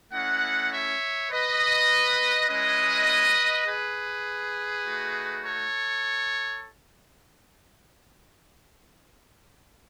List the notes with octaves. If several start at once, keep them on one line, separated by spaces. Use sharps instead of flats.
A3 C#4 E4 D#5 F#5
C#5 E5
B4 D#5
G#3 C#4 E4 B4 D#5
G#4 B4
A3 D#4 F#4
A4 C#5